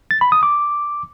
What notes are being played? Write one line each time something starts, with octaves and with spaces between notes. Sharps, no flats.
A6
B5
D#6
D6